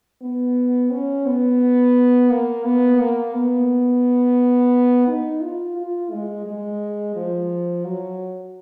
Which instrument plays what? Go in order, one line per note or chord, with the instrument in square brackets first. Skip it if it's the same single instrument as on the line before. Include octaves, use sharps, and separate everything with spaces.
[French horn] B3
C#4
B3
A#3
B3
A#3
B3
D#4
F4
F4
G#3
G#3
F3
F#3